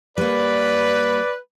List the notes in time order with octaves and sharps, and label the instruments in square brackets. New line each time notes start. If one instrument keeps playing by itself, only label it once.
[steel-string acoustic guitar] G3 A#3 [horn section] B4 [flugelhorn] D5